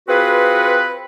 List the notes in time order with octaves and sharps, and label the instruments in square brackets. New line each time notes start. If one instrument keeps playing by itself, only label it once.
[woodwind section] C4 F4 F#4 G#4 B4